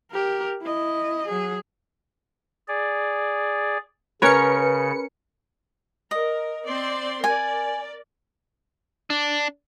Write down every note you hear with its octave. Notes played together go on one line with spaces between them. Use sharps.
G4 A#4
E4 D#5
F#3 G#4
G#4 D5
C#3 C#4 A#4 B4 C#5 C#7
A#4 D#5
C4 D5 C6
A#4 D5 G#5
D4